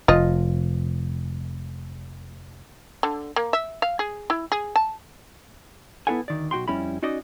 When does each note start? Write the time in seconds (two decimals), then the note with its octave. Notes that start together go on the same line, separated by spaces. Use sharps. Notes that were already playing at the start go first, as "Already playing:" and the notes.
0.08 F1 F4 D#5
3.03 D3
3.36 A#3
3.53 E5
3.82 F5
3.99 G#4
4.30 E4
4.52 G#4
4.76 A5
6.07 B3 E4 F4 A4 F#5 G#5
6.28 D2 D#3 D5
6.51 B1 F#4 G5 C6
6.68 F2 G3 C#4 E4 B5
7.02 C#4 D#4 F#4 D5 D#5